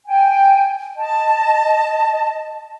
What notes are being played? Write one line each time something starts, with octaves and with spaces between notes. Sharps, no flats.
G5 G#5
D#5 A5